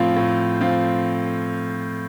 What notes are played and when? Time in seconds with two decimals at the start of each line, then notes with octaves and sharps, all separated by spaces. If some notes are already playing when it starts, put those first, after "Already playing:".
Already playing: A2 F3 C4 F4
0.16 A2
0.61 F3 C4 F4